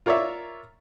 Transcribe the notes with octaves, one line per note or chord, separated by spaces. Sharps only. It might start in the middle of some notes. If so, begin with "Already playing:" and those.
F4 A#4 C#5 D5 E5